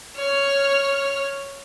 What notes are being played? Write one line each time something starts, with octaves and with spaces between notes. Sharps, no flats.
C#5 F6